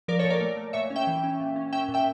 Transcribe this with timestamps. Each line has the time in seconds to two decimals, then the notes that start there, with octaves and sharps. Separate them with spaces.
0.08 F3 A#4 D5
0.19 A4 C#5
0.24 A#2
0.30 A#4 D5
0.41 A3
0.57 A3
0.73 A#2 C#5 E5
0.90 C#4
0.96 E5 G5
1.07 E3
1.24 C#4
1.40 A#2
1.56 C#4
1.73 C#4 E5 G5
1.88 A#2
1.94 E5 G5